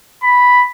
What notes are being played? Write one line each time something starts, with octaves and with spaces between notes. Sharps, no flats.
B5